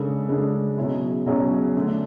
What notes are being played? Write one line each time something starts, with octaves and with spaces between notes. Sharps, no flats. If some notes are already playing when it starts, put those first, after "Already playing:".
Already playing: C#3 G#3 D4 A4
C#3 G#3 D4 A4
B2 F#3 C#4 E4 G#4
B2 F#3 C#4 E4 G#4
D3 A3 D4